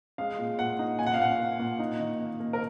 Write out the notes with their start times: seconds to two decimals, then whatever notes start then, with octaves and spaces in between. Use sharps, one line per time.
0.18 G#3 F5
0.39 A#2
0.59 A#2 F#5
0.79 D#4
0.99 A#2 G#5
1.06 F#5
1.14 F5
1.19 A#2 F#5
1.39 A#3
1.59 A#2
1.79 D#4
2.00 D#3
2.20 A#3
2.40 A#3
2.53 A#4